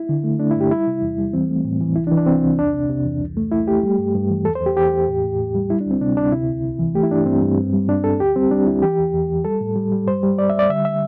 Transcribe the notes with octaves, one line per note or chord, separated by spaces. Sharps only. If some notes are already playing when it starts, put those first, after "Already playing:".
Already playing: E4
D3
A3
A3 D4
E4
G2 G4
G3 E4
C3
E2
G3
E3 C4
A3
A2
E3
C2 E4
D4
E3
D4
C2 C4
C2
E2 D4
C3
C3
E2
C2
A3
A3 E4
A3 G4
G3
G2
G2
E3
E2 A4
C5
E2
G4
E2 G4
E2
A2
A2
A2
G3
G3 E4
D4
D2 C4
C3 D4
D2 D4
C3 E4
C2
C2
E3
A3 G4
E4
G2 D4
G2 C4
G2
G2
G3
G2 D4
G2 A4
D2 G4
G3 C4
G3 D4
D2 E4
E3 G4
E2
E2
E2
G3 A4
A2
G3
G3
G2 C5
G3
G3 D5
E5
G3
D5
D3 E5
E5